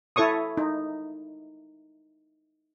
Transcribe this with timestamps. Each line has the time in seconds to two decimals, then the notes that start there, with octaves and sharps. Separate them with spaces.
0.16 E4 A4 C#5 C#6 D#6
0.57 D#4